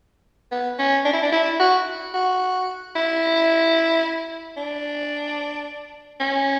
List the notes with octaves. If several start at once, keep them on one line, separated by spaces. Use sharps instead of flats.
B3
C#4
D4
E4
D4
E4
F#4
F#4
E4
D4
C#4